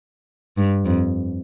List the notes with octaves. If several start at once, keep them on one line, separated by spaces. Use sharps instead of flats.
G2
F2